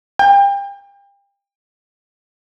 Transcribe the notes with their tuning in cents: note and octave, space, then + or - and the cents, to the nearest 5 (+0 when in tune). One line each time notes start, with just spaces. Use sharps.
G5 +35